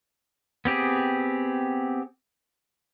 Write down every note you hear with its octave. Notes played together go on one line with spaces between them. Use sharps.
B3 C4 G4 G#4